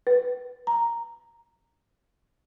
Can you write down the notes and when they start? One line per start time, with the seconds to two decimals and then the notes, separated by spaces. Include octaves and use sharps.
0.07 B4
0.67 A#5